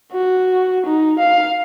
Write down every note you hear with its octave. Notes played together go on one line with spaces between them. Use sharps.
F#4
D#4
F5